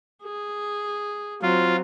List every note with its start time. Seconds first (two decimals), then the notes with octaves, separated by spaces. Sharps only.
0.23 G#4
1.42 F#3 C4 F4